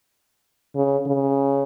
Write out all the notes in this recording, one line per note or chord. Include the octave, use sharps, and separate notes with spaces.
C#3
C#3